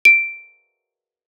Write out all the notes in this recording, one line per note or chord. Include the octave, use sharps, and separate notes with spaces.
D7